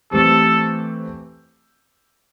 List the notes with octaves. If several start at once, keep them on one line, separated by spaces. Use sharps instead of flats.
E3 A3 C4 G4 A4